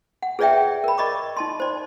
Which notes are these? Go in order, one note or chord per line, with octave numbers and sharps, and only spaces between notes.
F#5
G#4 B4 C#5 D5 E5 G5
A#4 B5
D5 D#5 B5 C#6 D6
D#4 A5 C6
C5 D5